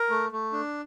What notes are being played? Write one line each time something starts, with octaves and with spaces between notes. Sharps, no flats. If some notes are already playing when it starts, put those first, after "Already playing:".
Already playing: A#4
A3
A3
D4